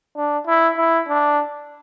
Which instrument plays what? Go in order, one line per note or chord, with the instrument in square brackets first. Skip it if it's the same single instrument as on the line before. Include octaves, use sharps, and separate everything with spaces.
[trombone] D4
E4
E4
D4